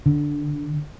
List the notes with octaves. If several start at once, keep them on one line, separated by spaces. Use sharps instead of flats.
D3